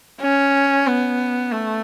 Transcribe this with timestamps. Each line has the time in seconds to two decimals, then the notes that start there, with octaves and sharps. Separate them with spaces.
0.22 C#4
0.87 B3
1.52 A3